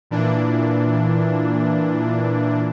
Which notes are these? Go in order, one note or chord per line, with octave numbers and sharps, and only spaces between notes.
A#2 E3 D4